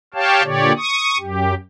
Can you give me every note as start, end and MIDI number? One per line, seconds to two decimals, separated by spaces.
0.14 0.43 67
0.14 0.43 73
0.14 0.43 77
0.14 0.43 79
0.14 0.43 81
0.43 0.72 46
0.43 0.72 50
0.43 0.72 67
0.43 0.72 73
0.43 0.72 74
0.77 1.18 85
0.77 1.18 87
1.18 1.54 42
1.18 1.54 67